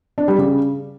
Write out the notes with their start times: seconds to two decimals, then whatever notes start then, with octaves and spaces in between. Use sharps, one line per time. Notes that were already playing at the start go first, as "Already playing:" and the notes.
0.18 D4
0.28 G3
0.38 C#3